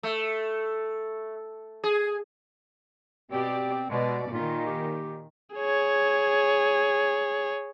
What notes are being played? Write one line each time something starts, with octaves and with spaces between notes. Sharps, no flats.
A3
G#4
B2 C4 G4 D5
B2 G#3 D5
A#2 D#3 F4
G4
G#4 C#5